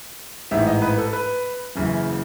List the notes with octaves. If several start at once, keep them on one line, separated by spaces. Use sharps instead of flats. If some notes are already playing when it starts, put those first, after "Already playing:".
A1 G#2 E3 E5
D#5
B4
A4
B4
F#1 F#2 C#3 E3